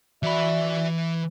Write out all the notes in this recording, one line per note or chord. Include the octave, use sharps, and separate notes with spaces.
E3 F#4 D5 E5 B5